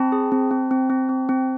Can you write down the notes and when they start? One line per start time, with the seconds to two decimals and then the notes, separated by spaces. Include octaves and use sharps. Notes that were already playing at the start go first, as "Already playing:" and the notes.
Already playing: C4 A5 B5
0.12 G#4
0.32 C4
0.51 C4
0.71 C4
0.90 C4
1.09 C4
1.29 C4